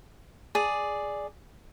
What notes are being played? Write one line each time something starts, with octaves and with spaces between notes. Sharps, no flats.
G#4 D5